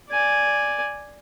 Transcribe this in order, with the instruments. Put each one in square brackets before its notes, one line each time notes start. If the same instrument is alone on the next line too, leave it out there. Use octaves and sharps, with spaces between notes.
[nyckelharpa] D5 G#5